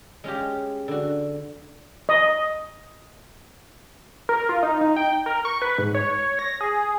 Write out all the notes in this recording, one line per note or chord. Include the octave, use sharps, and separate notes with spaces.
G#3 C#4 F4 G4
D3 F#4
D#5
A#4
F4
D#4
D#4
G5
A#4
C#6
B4
G#2
C#5
A#6
G#4